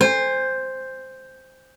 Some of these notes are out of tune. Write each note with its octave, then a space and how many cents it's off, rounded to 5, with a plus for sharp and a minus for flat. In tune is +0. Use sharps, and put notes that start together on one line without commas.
C5 +0 G#5 -35